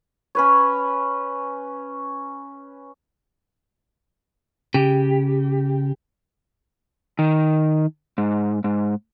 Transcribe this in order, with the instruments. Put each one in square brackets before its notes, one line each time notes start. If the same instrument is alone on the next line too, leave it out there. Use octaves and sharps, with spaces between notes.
[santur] C#4 B4 C#5
[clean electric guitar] C#3 [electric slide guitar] G4
[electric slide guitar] D#3
G#2
G#2